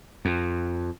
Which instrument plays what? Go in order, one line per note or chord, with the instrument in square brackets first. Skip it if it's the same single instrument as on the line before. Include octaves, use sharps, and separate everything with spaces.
[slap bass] F2